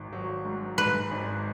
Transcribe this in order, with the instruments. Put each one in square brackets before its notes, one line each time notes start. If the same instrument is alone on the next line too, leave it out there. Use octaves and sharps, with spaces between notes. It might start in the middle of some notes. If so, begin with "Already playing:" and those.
Already playing: [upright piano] G#1 D#3
F#3
G#2
[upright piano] G#2 [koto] B4
[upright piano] G#1